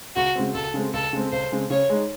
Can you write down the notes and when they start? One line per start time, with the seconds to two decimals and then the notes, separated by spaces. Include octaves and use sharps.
0.16 C#2 F#4
0.35 C#3 G#3 C4
0.54 C#2 A4
0.74 C#3 G#3 C4
0.93 C#2 A4
1.13 C#3 G#3 C4
1.32 C#2 C5
1.52 C#3 G#3 C4
1.70 C#3 C#5
1.90 G#3 D#4